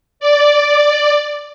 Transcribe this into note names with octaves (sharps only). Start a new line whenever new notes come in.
D5